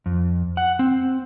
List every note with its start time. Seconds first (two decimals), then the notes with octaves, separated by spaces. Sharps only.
0.06 F2
0.57 F#5
0.79 C4